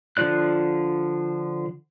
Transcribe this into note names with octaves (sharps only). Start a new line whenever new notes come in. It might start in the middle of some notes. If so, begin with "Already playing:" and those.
D3 F3 F4 D5 F#6